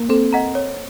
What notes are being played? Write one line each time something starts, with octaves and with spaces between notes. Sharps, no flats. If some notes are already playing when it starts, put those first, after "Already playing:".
Already playing: A#3
C4 A4
D#5 F#5 A#5
C#5